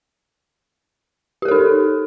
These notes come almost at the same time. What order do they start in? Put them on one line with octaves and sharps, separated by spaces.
G4 A#4 A4 D#4